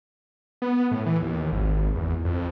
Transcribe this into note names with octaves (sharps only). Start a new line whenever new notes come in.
B3
A2
E3
D#2
G#1
E2
F2